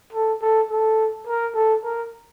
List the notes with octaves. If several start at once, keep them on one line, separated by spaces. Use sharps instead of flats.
A4
A4
A4
A#4
A4
A#4